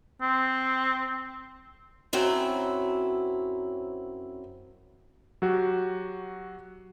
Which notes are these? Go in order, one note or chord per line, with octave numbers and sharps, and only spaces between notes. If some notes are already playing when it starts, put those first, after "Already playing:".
C4
F#2 F#3 C4 E4
F#3 F#4 G4